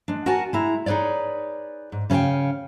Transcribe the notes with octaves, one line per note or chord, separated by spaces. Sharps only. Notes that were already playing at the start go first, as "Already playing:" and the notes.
G#3 D4
F#4 A#4 F#5 G#5 A5
G#3 E4 A#5
D#4 G#4 B4 C#5 D5
G#2
C#3 C#4 G4 F5 G5